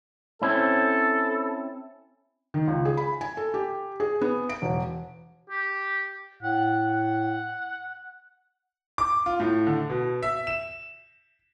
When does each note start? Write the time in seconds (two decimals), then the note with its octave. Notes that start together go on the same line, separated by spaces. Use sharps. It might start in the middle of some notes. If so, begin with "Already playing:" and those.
0.42 C4 C#4 E4 A4
2.54 D#3
2.68 C#2
2.85 G#4
2.97 B5
3.21 G#5
3.37 A4
3.54 G4
4.00 G#4
4.21 B3
4.49 D7
4.62 E1
5.50 G4
6.43 A2 F#5
6.86 F#5
8.98 D6
9.26 F4
9.40 A2
9.67 D3
9.90 B2
10.23 E5
10.47 E7